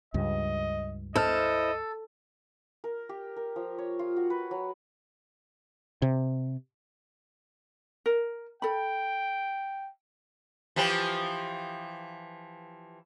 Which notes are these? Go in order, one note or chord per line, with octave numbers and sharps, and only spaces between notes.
C#2 G2 D#5
E4 A4 C5 D#5 F6
A#4
G4
A#4
F3
C#5
F4
F#4
B4
F#3
C3
A#4
A4 G5 B5
E3 F3 G4